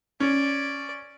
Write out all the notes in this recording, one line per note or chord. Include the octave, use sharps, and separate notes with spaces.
C#4 D5